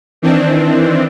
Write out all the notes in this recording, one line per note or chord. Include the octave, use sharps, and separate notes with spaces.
D#3 E3 C4 D4